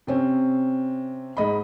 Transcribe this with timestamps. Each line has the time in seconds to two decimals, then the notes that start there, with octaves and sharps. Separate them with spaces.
0.07 C3 C4 C#4
1.37 G#2 D#5 B5